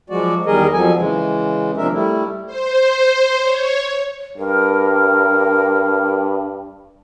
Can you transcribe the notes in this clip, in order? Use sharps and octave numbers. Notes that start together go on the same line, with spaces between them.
F3 F#3 G#3 F#4 D5
E2 D#3 G3 G#4 A#4 D#5
F2 F3 F#3 A4 G#5
C#3 E3 G#3
D#2 C3 F3 D4 A#4 E5
G3 A3 E4
C5
C#5
G2 A#4